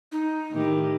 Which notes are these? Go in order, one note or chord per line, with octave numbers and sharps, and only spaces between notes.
D#4
A2 D#3 G4